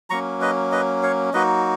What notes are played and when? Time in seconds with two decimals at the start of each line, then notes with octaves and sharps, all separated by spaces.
0.10 F#3 A#3 C#4 A#5 C#6
0.41 B4 D#5
0.72 B4 D#5
1.03 C#5 F5
1.33 F#3 A#3 D#4 F#4 B4 D#5